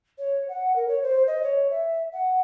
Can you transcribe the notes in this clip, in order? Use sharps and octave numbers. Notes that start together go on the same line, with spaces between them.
C#5
F#5
A#4
C#5
C5
D#5
C#5
E5
F#5